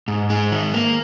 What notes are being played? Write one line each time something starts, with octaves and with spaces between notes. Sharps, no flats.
G#2
G#3
D#3
A#3